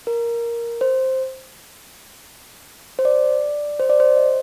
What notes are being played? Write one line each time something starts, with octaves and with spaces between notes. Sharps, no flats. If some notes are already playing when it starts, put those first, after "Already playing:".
A#4
C5
C5
D5
C5
D5
C5
D#5